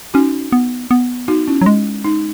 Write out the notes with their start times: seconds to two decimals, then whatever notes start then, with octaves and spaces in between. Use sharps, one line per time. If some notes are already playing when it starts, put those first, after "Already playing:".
0.14 C#4 D#4 F#4
0.52 B3
0.91 B3
1.28 D#4 F#4
1.47 C#4 E4
1.61 F#3
1.66 G#3
2.04 D#4